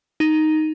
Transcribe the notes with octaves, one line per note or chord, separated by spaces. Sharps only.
D#4